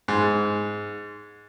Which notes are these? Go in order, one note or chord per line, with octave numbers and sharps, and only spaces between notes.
G#2